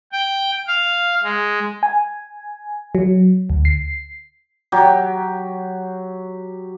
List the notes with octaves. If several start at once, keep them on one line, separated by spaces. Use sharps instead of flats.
G5
F5
G#3
G#5
F#3
D2
C7
F#3 G4